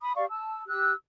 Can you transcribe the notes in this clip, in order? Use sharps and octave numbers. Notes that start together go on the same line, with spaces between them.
B5 D#6
G4 D5 F5 C#6
A5 E6
G4 E6 F#6